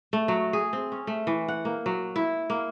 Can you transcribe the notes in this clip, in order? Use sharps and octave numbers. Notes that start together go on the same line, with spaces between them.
A3
F#3
G#4
C4
C#4
A3
E3
F#5
A#3
F#3
E4
A#3